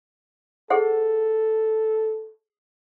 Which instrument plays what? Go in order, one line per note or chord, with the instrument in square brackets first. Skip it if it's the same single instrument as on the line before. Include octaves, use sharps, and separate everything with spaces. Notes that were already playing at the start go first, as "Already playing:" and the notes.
[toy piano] G#4 C5 F#5 [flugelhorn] A4